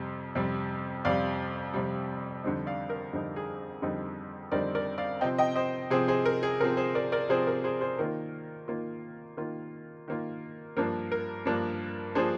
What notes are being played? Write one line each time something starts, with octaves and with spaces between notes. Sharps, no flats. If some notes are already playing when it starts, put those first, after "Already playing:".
Already playing: F2 C3 G3
F2 C3 G3
F2 C3 G3 D5 F5
F2 C3 G3
F2 D3 G3 C4 D#4
D5 F5
A#4
F2 D3 G3 C4 D#4
G#4
F2 D3 G3 C4 D#4
F2 D3 G3 C4 D#4 A#4 D5
A#4 D5
D5 F5
C3 F3 C4 D#5 G5
D#5 G5
C5 D#5
C3 F3 C4 G#4 C5
G#4 C5
A#4
G#4
C3 F3 C4 A#4
G#4 C5
A#4 D5
A#4 D5
C3 F3 C4 G#4 C5
A#4
G#4 C5
G#4 C5
D#3 A#3 F4 A#4
D#3 A#3 F4
D#3 A#3 F4
D#3 A#3 F4
G2 F3 A#3 D4 A#4
A#4
G2 F3 A#3 D4
F3 A#3 D4 G#4 C5